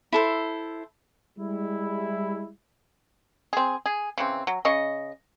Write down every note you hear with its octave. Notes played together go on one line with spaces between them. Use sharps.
E4 A4 C5
G3 G#3 E4
C4 G#4
G#4
C#3 E3 C4
F#3
C#3 D#5 C#6